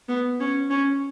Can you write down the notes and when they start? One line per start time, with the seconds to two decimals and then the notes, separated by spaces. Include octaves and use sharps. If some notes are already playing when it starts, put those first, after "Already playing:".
0.09 B3
0.40 C#4
0.70 C#4